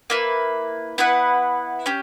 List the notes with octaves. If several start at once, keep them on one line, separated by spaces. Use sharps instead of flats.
A#3 E4 B4
B3 E4 B4 F#5
C#4 G4